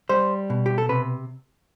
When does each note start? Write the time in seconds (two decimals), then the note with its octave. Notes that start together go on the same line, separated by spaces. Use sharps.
0.09 G3 C5
0.50 B2
0.66 G4
0.78 A4
0.89 C3 B4